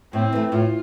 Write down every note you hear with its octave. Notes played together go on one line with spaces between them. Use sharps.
A2 C4
E3 A3
A2 F4